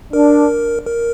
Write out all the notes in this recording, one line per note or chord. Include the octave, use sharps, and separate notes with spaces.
D4 A#4
A#4